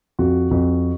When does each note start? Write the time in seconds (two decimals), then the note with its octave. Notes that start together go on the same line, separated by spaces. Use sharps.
0.19 F2 F#4
0.51 F2